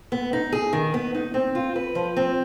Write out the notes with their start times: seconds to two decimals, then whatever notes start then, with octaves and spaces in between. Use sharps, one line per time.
0.12 B3
0.33 D#4
0.52 G#4
0.73 D#3
0.94 B3
1.15 D#4
1.34 C4
1.55 F4
1.76 B4
1.95 F3
2.17 C4